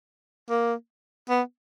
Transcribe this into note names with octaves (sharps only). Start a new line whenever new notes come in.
A#3
B3